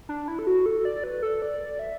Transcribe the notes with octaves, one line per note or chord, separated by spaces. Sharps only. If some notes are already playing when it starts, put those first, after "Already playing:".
D4
E4
A4
F#4
A4
D5
B4
A4
D5
E5